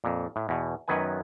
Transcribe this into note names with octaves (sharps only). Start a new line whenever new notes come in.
F2 A#2
A2
E2 B2
F#2 D#3 F#3 B3 B4 G#5